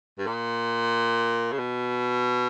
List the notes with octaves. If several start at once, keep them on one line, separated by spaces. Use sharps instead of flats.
G2
A#2
C#3
B2